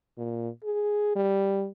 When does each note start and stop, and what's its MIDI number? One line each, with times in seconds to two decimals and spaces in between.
0.18 0.49 46
0.64 1.15 68
1.16 1.68 55